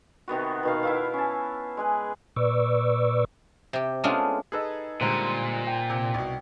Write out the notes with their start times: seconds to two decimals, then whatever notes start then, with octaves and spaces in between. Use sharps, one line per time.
0.28 C3 D#3 B3 F#4
0.63 B2 D#3 F5
0.83 E4 E5 F5
1.14 C#4 A5
1.77 G#3 G#4 B4
2.36 A#2 B4 D5 C#6 D6 E6
3.73 C3 G4
4.04 G#3 A3 B3 C#4 D4 F4
4.52 D#4 G#4 A4 B4 D#5 E6
5.01 A#2 D3 G3 G#3 C5 A#5
5.67 G5
5.90 C3
6.14 C2 B2